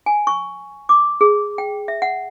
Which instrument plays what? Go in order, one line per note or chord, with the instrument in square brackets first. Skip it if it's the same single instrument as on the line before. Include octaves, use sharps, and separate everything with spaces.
[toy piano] G#5
C#6
D6
G#4
G5
E5
F#5